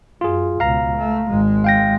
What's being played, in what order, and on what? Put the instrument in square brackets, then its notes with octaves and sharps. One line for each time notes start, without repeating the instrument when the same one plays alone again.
[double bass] F#2 [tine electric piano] F4 G#4
[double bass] C#2 B2 [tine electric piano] F5 A#5
[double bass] A3
G#1 G#3
[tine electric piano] F5 G5 A#6